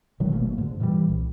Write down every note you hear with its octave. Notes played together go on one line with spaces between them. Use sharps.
B2 D#3 F#3 G#3
G1 B2 A3 A#3
G#2 D3
A#2 E3 F#3 G3
C2